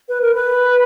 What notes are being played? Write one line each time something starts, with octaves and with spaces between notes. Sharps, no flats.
B4
A#4
B4